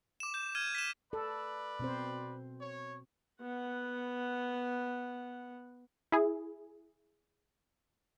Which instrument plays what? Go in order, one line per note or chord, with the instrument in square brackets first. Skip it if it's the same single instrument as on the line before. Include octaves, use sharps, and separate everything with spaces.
[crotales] D6 E7
G6 E7
F6 G#6 D#7
B6 D#7 E7
[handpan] A4 [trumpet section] B4 D5
[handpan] B2 C4 C5
[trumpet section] C#5
[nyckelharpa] B3 F#5
[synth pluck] E4 G#4